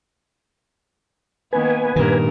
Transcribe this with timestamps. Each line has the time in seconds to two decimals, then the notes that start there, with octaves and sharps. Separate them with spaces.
1.53 D#3 A#3 B3 B4 G#5
1.96 G2 A#2 D#3 A#4